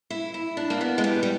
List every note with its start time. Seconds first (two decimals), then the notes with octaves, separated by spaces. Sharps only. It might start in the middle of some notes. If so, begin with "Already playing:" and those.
0.10 E4
0.34 E4
0.57 D4
0.70 A#3
0.81 B3
0.98 G#3
1.04 G3
1.23 G3